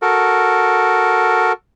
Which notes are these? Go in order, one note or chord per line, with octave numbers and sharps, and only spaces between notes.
F#4 A4 A#4